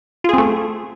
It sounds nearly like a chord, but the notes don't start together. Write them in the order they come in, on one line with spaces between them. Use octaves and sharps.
F4 G#4 C4 A3